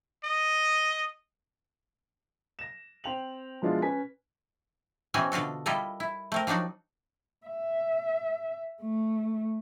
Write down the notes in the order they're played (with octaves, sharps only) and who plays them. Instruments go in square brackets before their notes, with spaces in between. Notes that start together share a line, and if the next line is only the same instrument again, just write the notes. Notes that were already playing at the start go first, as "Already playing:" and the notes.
[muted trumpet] D#5
[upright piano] A#6 E7
C4 C5 G5 F7 F#7
B2 F3 G#3 D4 E4 F4
C#4 B4 G#5 B6
[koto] B2 E3 C4 C#4 F#4 G#5
B2 D3 F4 F#4 A4
G3 E4 F4 A4 A#4 D#5
E4
A3 C4 A#4
F3 F#3 D4 D#4 F#4
[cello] E5
A3